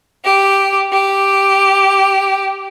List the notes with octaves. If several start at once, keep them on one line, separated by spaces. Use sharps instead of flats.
G4
G4